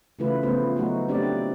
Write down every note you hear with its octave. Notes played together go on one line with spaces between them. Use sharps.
C#3 E3 A3 E4 F4 B4
C#3 F3 A3 B3 C5
F#3 A3 D#4 F#4
A3 C4 D4 G4 D5